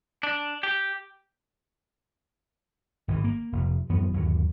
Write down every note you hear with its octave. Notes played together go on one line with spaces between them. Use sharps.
D4
G4
G#1 G#2 E3
A#3
F1
F#2 E3 F#3 B3
G1 D#2 F#3